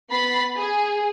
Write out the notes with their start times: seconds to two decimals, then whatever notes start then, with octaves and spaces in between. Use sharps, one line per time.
0.10 B3 B5 A6 B6 C7
0.57 G#4